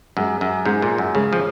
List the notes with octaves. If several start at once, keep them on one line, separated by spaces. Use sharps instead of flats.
F#2 G#3 C#4 G#4
F#2
G#2 G#3 C#4 G#4
A#2
F#2
C#3 G#3 C#4 G#4
F3